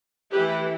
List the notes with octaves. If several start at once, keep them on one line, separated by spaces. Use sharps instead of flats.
E3 A3 E4 G4 B4